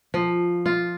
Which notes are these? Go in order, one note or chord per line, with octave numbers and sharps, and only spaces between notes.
F3
F4